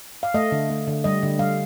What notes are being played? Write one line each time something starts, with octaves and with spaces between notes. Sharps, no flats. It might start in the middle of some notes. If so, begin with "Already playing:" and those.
F5
A3 D#5
D3
A3
D3
G3 D#5
D3
G3 F5